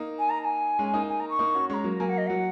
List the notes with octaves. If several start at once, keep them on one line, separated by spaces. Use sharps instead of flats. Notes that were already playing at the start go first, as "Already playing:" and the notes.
Already playing: A#3 D#4
G#5
A#5
A#5
G#5
G#3 C#4
A#3 D#4
G#5
A#5
C#6
A#3 D#4
C#4 F#4
G#3 C#4 A#5 C#6
F#3 A#3
F#3 A#3 G#5
F#5
D#5
F#3 F#5